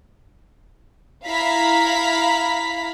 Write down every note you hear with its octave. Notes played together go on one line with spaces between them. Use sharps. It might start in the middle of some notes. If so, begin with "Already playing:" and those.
E4 F5 A#5 B5 B6